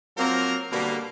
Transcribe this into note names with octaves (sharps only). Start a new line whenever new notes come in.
F3 F#3 A#3 C4 A#4
B2 D3 G3 A#3